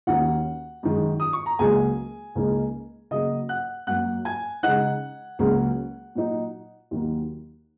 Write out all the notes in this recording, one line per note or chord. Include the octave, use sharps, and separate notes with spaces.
D#2 D#3 A#3 C#4 F#4 F#5
F#2 D#3 G#3
D#6
C#6
A#5
C#2 C#3 F#3 A#3 G#4 G#5
C#2 C#3 A#3 D#4
C#3 F#3 A#3 D#5 D#6
F#5 F#6
F#2 F#3 A#3 C#4 F#5 F#6
G#5 G#6
C#3 G#3 D#4 F#5 F#6
C#2 C#3 F#3 A#3 C#4
A#2 F#3 D#4
D#2 D#3 F#3 A#3